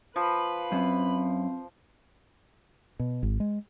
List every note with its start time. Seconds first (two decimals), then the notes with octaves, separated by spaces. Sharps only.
0.16 F3 B4 B5
0.72 F#2 C4
2.99 B2
3.23 G#1
3.40 G#3